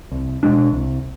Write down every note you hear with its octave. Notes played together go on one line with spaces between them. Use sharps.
C2
B2 G#3 D4
C2